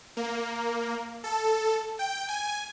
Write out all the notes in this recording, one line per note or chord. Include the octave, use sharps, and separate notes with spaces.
A#3
A4
G5
G#5